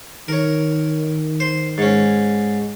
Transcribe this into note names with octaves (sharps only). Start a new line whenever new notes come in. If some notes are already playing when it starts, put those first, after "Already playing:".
D#3 A#4 C#5
C5
G#2 C#4